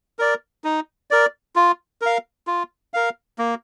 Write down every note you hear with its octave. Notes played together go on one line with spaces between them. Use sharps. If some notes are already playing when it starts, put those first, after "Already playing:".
A#4 D5
D#4
A#4 D5
F4
A#4 F5
F4
A#4 F5
A#3